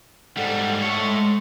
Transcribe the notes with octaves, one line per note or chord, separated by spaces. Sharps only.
G#2 G3 A4 D5 F#5
A3 C#5
G#3